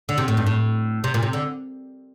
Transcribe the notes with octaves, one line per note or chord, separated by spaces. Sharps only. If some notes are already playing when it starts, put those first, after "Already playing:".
D3
C3
A2
G2
A2
C3
A#2
C3
D3